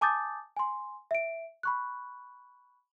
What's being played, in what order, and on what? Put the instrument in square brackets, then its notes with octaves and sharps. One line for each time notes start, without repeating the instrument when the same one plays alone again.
[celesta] G#5 A5 D6 D#6 G6 A6
G#5 C6
E5 D7
B5 C#6 F#6